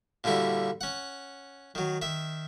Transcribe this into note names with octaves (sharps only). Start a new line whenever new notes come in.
A#2 D3 G3 E4 F#4
C#4 F#5
D#3 F#3
D#3 E5